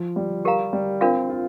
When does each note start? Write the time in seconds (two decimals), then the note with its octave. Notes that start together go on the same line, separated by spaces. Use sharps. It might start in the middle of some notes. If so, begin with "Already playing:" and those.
Already playing: F3
0.16 G3
0.45 G4 A#4 F5 A#5
0.73 G3
1.01 C4 D4 F4 A#4 F5
1.29 F4